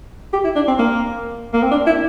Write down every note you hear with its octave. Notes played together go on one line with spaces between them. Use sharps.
G4
E4
D4
C4
A#3
A#3
C4
D4
E4